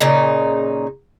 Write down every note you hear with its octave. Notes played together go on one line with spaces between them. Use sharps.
A#2 C#3 D#4